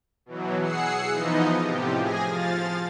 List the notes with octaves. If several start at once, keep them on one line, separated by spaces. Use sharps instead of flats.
B2 E3 F#3
G#4 F#5 E6 C7 C#7
E3 F3 B3 D#4 D#5
A2 C3 F3 G4
G#4 G#5 A#6
F3 F5 A6